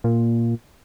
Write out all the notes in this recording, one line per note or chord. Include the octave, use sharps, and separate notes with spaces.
A#2